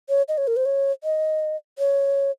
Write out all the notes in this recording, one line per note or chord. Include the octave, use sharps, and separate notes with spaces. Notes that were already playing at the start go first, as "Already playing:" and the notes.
C#5
D#5
C#5
A#4
C5
C#5
D#5
C#5